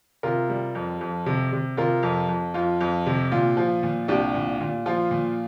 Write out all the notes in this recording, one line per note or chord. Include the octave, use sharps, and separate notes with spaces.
C3 F4 A#4
G3
F2
F2
C3
C3
C3 F4 A#4
F2
F2
F2 F4
F2
C3
A#2 F4
F3
A#2
C2 D4 G4
A#2
A#2
F3 F4
A#2